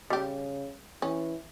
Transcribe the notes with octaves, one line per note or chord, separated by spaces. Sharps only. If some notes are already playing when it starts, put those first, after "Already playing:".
C#3 G3 G4
E3 C#4